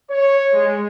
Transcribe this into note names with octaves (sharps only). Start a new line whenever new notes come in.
C#5
G#3